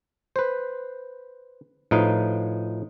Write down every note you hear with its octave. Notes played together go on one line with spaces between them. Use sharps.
B4 C5
A2 F3 D#4 B4 F5